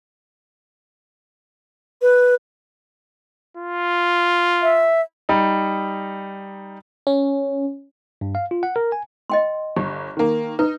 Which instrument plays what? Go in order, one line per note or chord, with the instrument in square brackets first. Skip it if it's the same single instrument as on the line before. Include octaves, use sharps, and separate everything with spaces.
[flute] B4
[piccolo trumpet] F4
[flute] E5
[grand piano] G3 D#4
[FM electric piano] C#4
[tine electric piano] G2
F5
F4
F#5
A#4
G#5
[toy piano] D#5 G5 C6
[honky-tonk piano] G1 [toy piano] G4
[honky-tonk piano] D#3 A#3
[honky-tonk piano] D#4 [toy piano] B4